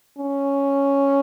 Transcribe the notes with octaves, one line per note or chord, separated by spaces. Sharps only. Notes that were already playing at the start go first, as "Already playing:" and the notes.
C#4